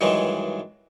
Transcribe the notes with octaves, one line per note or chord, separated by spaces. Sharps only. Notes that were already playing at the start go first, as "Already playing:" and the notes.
G2 D#3 E3 F#3 G#3